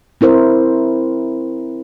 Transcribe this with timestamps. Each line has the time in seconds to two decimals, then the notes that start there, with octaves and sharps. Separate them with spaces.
0.21 C4 E4 A#4 C5